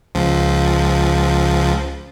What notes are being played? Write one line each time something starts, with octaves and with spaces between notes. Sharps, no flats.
C#2 F3